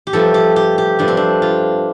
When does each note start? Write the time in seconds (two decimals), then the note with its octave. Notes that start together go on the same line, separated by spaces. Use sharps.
0.07 G4
0.13 G2 F3 A3 A4
0.34 G4
0.56 G4
0.78 G4
0.99 G2 F3 A3 D4
1.08 C4
1.17 D4
1.42 F4